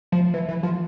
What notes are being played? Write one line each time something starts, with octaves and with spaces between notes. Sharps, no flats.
F3
E3
E3
F3